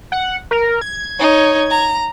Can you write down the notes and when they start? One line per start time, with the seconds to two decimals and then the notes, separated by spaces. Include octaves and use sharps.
0.12 F#5
0.51 A#4
0.81 G#6
1.19 D#4 C#5
1.70 A#5